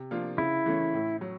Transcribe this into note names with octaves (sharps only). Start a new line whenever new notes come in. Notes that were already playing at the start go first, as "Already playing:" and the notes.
Already playing: C3
F3 A#3 D4 F4
C#3 E4
E3 A3 C#4
A2
F#3